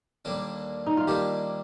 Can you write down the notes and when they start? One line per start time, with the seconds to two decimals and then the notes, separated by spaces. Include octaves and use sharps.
0.25 D#2 D3 G3 A#3 D4
0.86 D#4
0.97 F4
1.07 D#2 D3 G3 A#3 D4 G4